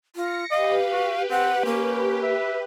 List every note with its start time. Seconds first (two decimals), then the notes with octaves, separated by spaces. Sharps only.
0.16 F4 A#6 C#7
0.51 G4 B4 D#5 F5
0.92 F#4
1.30 C4 F#5
1.65 A#3 C#4
2.23 E5